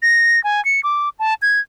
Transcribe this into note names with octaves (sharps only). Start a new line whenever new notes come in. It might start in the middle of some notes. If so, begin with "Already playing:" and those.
A#6
G#5
C#7
D6
A5
G#6